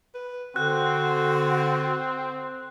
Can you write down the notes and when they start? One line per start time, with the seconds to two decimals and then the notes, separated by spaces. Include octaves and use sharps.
0.15 B4
0.56 D3 C4 F#4 F#6